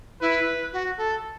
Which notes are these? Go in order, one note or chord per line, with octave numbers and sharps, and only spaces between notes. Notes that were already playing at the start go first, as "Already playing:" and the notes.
E4 B4
F#4
A4